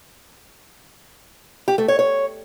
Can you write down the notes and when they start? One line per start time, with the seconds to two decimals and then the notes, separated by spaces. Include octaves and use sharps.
1.68 G4
1.78 A3
1.88 C#5
1.99 C#5